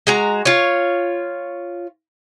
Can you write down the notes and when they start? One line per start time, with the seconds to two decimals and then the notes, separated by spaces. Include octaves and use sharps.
0.07 G#3 F#4 A#5
0.45 F4 C#5